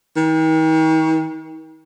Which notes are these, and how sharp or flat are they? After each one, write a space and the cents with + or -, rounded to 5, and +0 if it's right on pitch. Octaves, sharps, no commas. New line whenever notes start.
D#3 +40